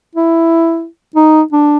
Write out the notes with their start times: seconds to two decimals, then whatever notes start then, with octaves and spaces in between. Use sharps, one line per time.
0.16 E4
1.16 D#4
1.53 D4